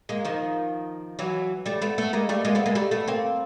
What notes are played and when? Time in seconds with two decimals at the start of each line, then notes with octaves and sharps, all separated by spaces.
0.09 G#3 A#3
0.25 D#3 F3
1.19 E3 F#3
1.66 G3 A3
1.82 A3 B3
1.98 A3 B3
2.13 G#3 A#3
2.29 G3 A3
2.45 G#3 A#3
2.55 A3 B3
2.66 G#3 A#3
2.75 G3 A3
2.91 A3 B3
3.07 A#3 C4